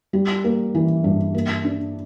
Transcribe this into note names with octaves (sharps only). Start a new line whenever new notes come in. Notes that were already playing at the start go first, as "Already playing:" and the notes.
G3
A#3
E3
G2
A#3
D4